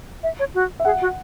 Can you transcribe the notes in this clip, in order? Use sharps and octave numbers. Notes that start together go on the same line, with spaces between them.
E5
C#5
F#4
E5
G#4 F#5
F#4